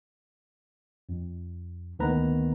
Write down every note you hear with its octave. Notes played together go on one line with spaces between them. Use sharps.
F2
D2 D#3 A#3 B3 B4 A#5